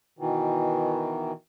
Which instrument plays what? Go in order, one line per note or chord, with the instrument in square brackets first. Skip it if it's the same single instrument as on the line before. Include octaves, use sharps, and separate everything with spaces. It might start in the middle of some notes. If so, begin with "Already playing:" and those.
[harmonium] B2 D#3 E3